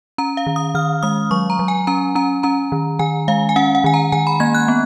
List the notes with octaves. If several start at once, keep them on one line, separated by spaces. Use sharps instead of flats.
C#4 A#5
F5
D#3
D#6
D#3 F6
G#3 D#6
F#3 C#6
A#5
F#3
G#5
C#4 A#5
C#4 A#5
C#4 A#5
D#3
D#3 G#5
G#3 F5
G#5
C#4 F#5
F#5
D#3 G#5
A#5
D#3 G#5
B5
A#3 G#6
F#6
B3